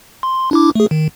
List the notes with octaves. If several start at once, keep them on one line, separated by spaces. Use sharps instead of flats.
C6
D4 E4 D6
A3 G#4
D#3